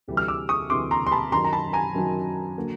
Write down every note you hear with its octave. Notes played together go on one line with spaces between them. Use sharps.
D2 C3 E3 G3
F6
D6 E6
C#6 D#6
D2 C3 E3 G3 C6 D6
A#5 C6
C6
A5 B5
F#2 D#3 F#3 A#5 C6
A#5
A5 B5
G#5 A#5
F#2 D#3 F#3
D3 F#3 A#3